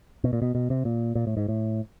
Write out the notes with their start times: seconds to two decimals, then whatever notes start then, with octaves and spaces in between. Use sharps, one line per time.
0.24 B2
0.33 A#2
0.42 B2
0.55 B2
0.70 C3
0.85 A#2
1.15 A#2
1.27 A2
1.37 G#2
1.48 A2